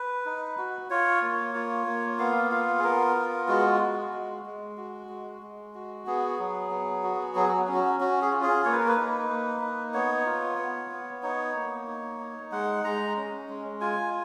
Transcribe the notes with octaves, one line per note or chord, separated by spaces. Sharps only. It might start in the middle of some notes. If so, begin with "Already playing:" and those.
Already playing: B4
D#4
F#4
F4 C#5
A#3
F4
A#3
B3 F5
F4 F5
G#4
B3 A#4
F4
G#3 F#4
F#4
G#3
G#3
F#4
G#3
G#3
F#4
B3 G#4
F#3
B3
F#4
F#3 G#4
F#4
C#4
F#4
C#4 F#4
G#4
F4
G#4
A#3 C#5
B4
A#4
B4
D#4
A#3
D#4
B3 C#5
F4
B3
B3
D#4 C#5
A#3
D#4
D#4
G#3 F#5
G#3 A#5
C#4
G#3
F4 G#5